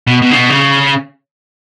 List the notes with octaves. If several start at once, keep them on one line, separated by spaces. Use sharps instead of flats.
B2
B2
C#3
B2
C#3